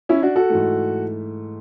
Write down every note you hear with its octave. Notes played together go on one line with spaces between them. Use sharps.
C#4 E4
D4 F#4
F#4 A4
G#2 E3 A3